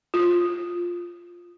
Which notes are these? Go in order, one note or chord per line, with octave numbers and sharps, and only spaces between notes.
F4